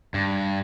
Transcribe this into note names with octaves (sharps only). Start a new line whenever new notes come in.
G2